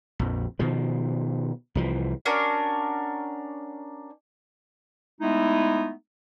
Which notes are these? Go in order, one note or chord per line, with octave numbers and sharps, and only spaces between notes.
A#1 F2
B2 D#3 F3
C2 E3 F3
C#4 D4 F#4 A#4
G#3 A3 B3 D#4 E4